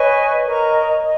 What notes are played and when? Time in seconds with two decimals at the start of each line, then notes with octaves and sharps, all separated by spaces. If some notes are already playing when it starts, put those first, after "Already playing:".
Already playing: B4 C#5 D#5 G#5 C#6
0.45 A#4 D#5 A#5 C#6
1.02 D#5